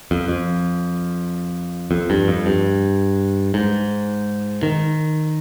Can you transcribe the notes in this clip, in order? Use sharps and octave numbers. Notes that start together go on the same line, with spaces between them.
F2
F2
F2
G2
F2
G2
G#2
D#3